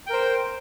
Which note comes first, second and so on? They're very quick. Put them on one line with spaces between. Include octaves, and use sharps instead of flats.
G5 A#4 C5